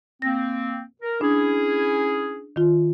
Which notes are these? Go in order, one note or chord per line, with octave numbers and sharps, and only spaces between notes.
A#3 C4 A#6
A#4
C#4 D4 E4 G#4
D#3 F4